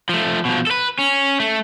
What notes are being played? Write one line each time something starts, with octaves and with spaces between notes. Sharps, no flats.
F3 A3
B2 F3
A4 B4
C#4
A3